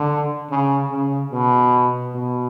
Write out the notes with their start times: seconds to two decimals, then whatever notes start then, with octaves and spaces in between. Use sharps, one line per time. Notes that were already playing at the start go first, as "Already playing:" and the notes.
Already playing: D3
0.50 C#3
0.91 C#3
1.32 B2
2.14 B2